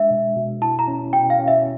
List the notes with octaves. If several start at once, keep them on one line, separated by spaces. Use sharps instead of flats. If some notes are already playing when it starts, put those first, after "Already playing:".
Already playing: G#3 D4 E5
B2
B2
E4 A5
A#5
C#4
B2 G5
F5
C#4
E5